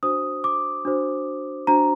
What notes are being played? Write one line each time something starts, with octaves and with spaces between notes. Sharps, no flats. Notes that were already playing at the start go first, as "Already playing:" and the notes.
D4 F#4 C5 D#6
D6
D4 F#4 C5
D4 F#4 C5 A#5